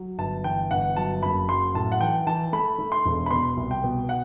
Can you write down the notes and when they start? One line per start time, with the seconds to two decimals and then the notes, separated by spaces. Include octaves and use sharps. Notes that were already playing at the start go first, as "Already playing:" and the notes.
Already playing: F#3
0.18 G1 A5
0.44 E3 G5
0.71 G1 F#5
0.97 F#3 A5
1.23 F#1 B5
1.49 F#3 C6
1.75 A2 A5
1.92 F#5
2.00 E3 G5
2.27 E3 A5
2.53 A3 B5
2.79 A3
2.92 C6
3.05 E1
3.26 B5
3.31 B2 C6
3.57 C2
3.71 G5
3.84 B2
4.09 F#5